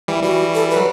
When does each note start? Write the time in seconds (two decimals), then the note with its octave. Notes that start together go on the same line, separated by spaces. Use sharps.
0.08 E3 G3
0.23 E3 G3 F#4
0.54 A4
0.70 B4
0.76 F#3